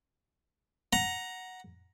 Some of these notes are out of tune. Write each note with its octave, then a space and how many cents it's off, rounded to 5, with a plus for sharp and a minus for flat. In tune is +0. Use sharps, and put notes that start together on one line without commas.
F#5 +0 A#5 +10